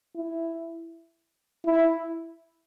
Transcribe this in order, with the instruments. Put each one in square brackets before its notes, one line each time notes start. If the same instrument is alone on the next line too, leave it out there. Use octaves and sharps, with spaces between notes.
[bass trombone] E4
E4